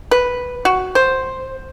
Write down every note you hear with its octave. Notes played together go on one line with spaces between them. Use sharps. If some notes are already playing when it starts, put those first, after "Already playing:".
B4
F#4
C5